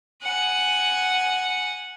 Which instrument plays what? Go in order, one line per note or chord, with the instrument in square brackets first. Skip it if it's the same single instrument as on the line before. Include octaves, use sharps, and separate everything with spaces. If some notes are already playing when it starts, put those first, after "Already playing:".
[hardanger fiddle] F#5 G#5